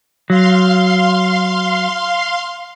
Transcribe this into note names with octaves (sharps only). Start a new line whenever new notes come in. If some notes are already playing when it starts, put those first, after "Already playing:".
F#3 F5 C6